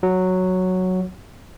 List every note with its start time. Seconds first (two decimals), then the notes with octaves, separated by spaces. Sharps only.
0.03 F#3